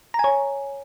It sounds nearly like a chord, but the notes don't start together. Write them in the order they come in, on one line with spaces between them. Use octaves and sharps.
A#5 G#5 C#5